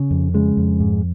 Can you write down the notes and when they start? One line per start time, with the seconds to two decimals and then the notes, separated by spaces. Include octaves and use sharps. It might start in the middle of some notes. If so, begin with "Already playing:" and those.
Already playing: C#3
0.11 F2
0.34 C#3 G#3
0.57 F2
0.80 G#2